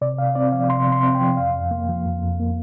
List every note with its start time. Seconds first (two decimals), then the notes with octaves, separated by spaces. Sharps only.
0.01 C3 D5
0.18 C3 F5
0.35 C4 D5
0.52 F3 F5
0.69 C3 C6
0.87 C3
0.92 C6
1.03 C4
1.15 G5
1.21 F3
1.37 F2 F5
1.54 F2
1.71 A#3
1.89 F3
2.06 F2
2.23 F2
2.40 A#3